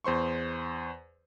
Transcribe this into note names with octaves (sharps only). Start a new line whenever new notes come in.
E2 C5 C6 C#6